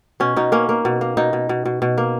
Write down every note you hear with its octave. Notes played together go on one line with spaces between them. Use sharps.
B2 C#4
B2 D#4
A#3 C#4
A#3
B2
A#3
B2 D#4
B2
B2
B2
B2
A#3